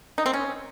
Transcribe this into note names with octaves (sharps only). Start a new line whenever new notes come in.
D#4
C4
C#4